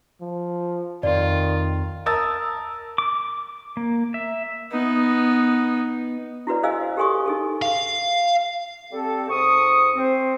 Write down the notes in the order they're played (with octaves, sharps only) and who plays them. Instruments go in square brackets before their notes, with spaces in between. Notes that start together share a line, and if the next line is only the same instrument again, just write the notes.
[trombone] F3
[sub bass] F2 [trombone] D#3 [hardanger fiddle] F4 [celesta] D5
[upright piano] A#4 A5 D#6 E6 A6
[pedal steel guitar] D6
A#3
E5
[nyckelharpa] B3 D#4
[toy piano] E4 F#4 B4 D5
G#4 C5 D#5 F5 G#5 E6
G4 A4 G#5 C6 C#6 D#6
D#4 G#4 A4
[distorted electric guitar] F5
[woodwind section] G3 C4 A4
G#2 C#6 D#6
C4 C5